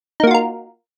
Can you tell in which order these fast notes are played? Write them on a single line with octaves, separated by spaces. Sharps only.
D#4 A#3 F#4 F4 A#4